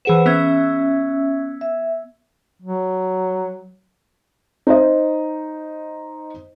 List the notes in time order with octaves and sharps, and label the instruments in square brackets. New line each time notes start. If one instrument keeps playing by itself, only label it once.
[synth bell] E3 G#4 E7 [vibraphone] B4 C5 F#5
[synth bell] B3 E6 G#6 [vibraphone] C#4 E5
[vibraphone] E5
[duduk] F#3
[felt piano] D#4 C5 D#5